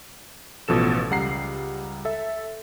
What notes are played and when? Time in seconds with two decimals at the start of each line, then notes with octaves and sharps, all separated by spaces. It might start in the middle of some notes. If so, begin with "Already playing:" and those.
0.68 A1 B2 F3 A4 E7
1.10 C#2 G3 F#5 A#5 C7
2.05 A4 E5